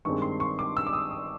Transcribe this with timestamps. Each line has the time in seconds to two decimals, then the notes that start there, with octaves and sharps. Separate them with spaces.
0.05 G2 D#3 G#3 C4 C#6
0.22 C6
0.40 C#6
0.59 D6
0.77 E6
0.87 D6
0.93 D#6
1.11 D#6